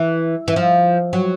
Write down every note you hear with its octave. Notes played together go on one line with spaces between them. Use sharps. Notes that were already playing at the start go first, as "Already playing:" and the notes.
Already playing: E3
E3
F3
F#3